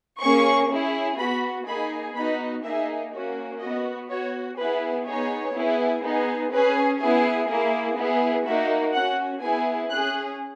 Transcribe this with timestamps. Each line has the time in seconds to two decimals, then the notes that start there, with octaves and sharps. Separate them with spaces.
0.21 A#3 C#4 G#4 C#6
0.70 C#4 E4 G#4
1.18 B3 F#4 B5
1.66 A#3 D#4 G#4 B5
2.15 B3 D#4 F#4 B5
2.63 A#3 D#4 G#4 E5
3.13 A#3 C#4 F#4
3.60 B3 F#4 D#5
4.09 B3 F#4 C#5
4.57 B3 E4 G#4 B4
5.06 B3 D#4 G#4 C#5
5.55 B3 E4 G#4
6.02 B3 D#4 G#4
6.52 C#4 G#4 B4
7.00 B3 E4 G#4
7.48 A#3 E4 G#4
7.97 B3 E4 G#4
8.45 A#3 D#4 F#4 E5
8.94 C#4 F#4 F#5
9.42 B3 E4 G#4 G#5
9.91 C#4 G#4 F#6